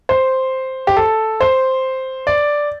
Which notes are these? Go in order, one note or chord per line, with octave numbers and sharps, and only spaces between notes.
C5
G4
A4
C5
D5